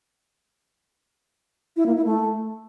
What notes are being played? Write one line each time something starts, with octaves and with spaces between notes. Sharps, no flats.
E4
A#3
E4
A3